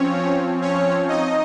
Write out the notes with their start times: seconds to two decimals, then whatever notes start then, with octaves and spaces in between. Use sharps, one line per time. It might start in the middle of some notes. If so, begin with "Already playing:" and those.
Already playing: F3 C4 C#4 C#5
0.61 C#4 C#5
1.08 D#4 D#5